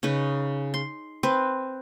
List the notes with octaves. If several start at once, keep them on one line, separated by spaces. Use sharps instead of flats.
C#3 C#4 D#4 B4
C6
C4 B4